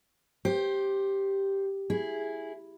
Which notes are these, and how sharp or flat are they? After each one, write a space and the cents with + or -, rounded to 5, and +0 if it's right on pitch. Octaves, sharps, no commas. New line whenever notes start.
G4 +0 C5 +15
E4 +0 G#4 +0